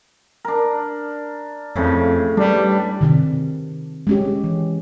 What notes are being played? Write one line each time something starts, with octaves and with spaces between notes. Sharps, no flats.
D4 A#4
F2 A2 C#3
G3 D4 B4
C3 D#3
G#3 C#4 G4
E3